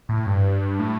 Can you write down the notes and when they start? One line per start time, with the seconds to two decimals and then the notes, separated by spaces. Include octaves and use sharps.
0.09 A2
0.26 G2
0.79 A2